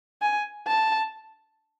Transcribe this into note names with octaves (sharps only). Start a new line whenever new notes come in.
G#5
A5